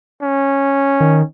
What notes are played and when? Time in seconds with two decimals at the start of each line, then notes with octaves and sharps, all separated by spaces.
0.22 C#4
1.01 D#3